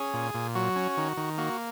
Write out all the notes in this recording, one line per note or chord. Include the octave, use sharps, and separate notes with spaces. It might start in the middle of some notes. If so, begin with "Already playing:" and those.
Already playing: C#4 G#4
A#2
A#2
F#3 F#4
C#4
D#3
D#3
A#3 F#4